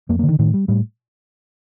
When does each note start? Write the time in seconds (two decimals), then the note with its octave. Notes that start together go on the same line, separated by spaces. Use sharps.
0.09 F2 A#3
0.19 A#3
0.23 D3
0.28 D#3
0.39 A2 D#3
0.54 G3
0.68 A2 G3